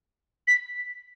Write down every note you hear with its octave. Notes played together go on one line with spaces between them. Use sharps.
B6